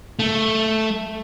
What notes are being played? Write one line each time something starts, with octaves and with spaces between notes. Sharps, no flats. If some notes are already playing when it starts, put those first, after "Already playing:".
A3